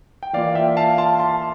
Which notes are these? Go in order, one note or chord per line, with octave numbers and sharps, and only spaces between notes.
G5
E3 A#3 F4 D5 F5
E5 G5
F5 A5
A5 C6
A5 C6